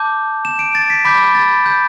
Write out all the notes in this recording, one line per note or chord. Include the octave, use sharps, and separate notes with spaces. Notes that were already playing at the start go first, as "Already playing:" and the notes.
Already playing: A5 D6 G6
E7
D7
A6
B6
B5 D6 G6 B6
A6
G6